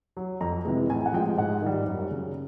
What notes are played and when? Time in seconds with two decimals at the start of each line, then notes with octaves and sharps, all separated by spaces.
0.17 F#3
0.41 F2 A#5
0.65 C3 E3 G#3
0.89 A2 G#5
1.06 F#5
1.13 F3 G#3 G5
1.37 G#2 F#5
1.62 D#3 G3
1.86 F#2
2.11 C#3 F#3